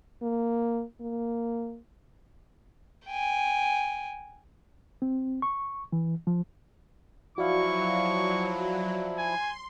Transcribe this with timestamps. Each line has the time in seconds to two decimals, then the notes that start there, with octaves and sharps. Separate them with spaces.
0.22 A#3
1.00 A#3
3.06 G5 G#5
5.02 C4
5.42 C#6
5.93 E3
6.27 F3
7.38 F3 F#3 E4 F#4 D5 F5 C#6
9.18 G#5 C6